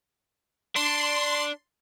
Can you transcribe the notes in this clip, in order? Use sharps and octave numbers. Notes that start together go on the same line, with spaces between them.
D4 C6